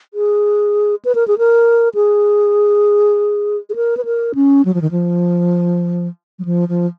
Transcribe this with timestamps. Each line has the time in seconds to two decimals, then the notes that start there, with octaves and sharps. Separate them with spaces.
0.14 G#4
1.05 B4
1.15 A#4
1.28 G#4
1.38 A#4
1.95 G#4
3.69 G#4
3.76 A#4
3.97 B4
4.05 A#4
4.35 C#4
4.65 F#3
4.74 F3
4.82 D#3
4.91 F3
6.39 F#3
6.45 F3
6.69 F3